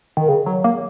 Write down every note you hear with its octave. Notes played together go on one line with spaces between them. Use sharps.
D#3
C#3
F#3
A#3